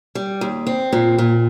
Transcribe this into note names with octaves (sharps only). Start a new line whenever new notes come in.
G3
D#2
C4
A#2
A#2